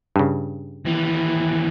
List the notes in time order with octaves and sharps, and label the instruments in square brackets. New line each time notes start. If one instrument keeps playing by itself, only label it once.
[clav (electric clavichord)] G2 C#3
[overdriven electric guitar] D#2 E3